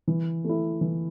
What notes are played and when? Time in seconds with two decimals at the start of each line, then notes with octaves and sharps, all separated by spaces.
0.08 E3
0.44 A3 E4
0.81 E3